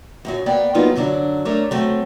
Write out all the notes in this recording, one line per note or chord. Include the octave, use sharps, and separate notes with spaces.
F#2 A#2 F#3
A#3 B3 D5 G5
F#3 A#3 B3 D#4 F4
F#2 D3 F#3 D4
A3 D4 A#4 C#5 A#5
F#3 A3 C4